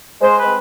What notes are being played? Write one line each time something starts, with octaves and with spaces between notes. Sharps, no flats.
G#3 C5
B4
C4